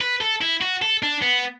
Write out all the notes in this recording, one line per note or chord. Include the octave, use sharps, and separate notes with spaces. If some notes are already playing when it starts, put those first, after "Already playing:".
B4
A4
E4
F#4
A4
D4
B3